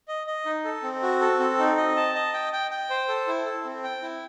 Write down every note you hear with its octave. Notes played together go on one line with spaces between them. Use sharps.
D#5
D#5
D#4
A4
C4
F#4
A4
C4
D#4
D#5
A5
D#5
G5
G5
G5
C5
A4
E4
A4
C4
G5
E4